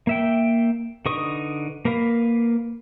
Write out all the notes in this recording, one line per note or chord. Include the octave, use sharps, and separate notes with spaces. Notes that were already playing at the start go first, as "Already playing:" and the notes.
A#3 E5 G5
D3 D#4 B4 C#6 D#6
A#3 A#4 B4 F5